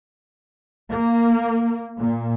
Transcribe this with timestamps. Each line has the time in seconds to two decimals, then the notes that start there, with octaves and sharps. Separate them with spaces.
0.90 A#3
1.99 A#2